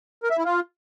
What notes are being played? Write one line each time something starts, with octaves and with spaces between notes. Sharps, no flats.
A#4
E5
E4
F4